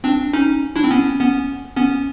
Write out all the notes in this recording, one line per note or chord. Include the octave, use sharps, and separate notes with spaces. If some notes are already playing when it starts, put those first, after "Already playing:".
C4 D4
C#4 D#4
D4 E4
C4
B3 C#4
B3 C#4
B3 C#4